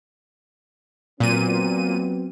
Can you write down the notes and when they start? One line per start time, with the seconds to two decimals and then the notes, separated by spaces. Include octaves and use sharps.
1.20 A#2 F#3 B3 C4 D#7